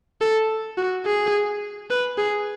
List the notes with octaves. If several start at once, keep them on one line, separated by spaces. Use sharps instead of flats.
A4
F#4
G#4
B4
G#4